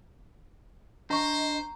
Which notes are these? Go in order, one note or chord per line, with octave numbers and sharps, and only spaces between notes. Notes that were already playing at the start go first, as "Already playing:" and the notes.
D4 C5 D#5 A#5 C#6